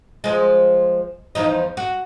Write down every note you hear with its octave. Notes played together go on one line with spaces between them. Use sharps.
F3 G#3
E2 F3 D#4
F#4